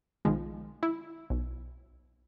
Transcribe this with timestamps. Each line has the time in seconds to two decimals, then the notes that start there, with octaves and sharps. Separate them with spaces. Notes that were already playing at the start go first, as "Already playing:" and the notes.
0.25 B1 D#3 F3 G#3
0.83 E4
1.30 B1